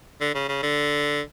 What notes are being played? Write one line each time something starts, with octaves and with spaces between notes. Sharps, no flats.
D3
C#3
C#3
D3